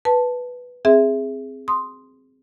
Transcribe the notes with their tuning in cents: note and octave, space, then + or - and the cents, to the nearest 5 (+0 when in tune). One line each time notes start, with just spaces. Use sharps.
B4 +0 A5 +0
C4 +0 G#4 +0 E5 +0
C6 +0 D#6 +0